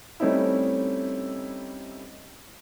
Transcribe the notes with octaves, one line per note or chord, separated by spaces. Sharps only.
G3 A3 C4 C#4 D#4 E4